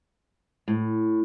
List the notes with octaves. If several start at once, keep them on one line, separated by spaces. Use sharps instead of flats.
A2